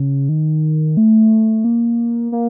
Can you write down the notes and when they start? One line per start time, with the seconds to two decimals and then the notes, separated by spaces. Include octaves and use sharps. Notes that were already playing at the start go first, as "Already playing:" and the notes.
Already playing: C#3
0.29 D#3
0.97 A3
1.64 A#3
2.32 A#3